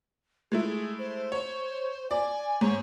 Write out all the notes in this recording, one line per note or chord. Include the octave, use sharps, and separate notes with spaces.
G#3 A3 E4 G#4
C5
C#5
D5 G#5
G#2 C#5